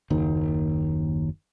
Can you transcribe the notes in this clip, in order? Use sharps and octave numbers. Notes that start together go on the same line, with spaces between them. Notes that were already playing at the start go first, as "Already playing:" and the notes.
F#1 D#2 D#3